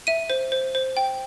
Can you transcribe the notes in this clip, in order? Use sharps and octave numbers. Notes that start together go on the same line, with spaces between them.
E5 D#7
C5
C5
C5
G5